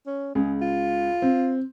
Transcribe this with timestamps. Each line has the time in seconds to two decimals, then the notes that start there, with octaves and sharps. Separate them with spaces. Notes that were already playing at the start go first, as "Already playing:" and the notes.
0.07 C#4
0.35 C#2 G#4
0.62 F4
1.22 C4